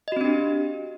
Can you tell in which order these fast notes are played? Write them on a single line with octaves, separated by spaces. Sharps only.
D#5 F#4 C4 D4 G4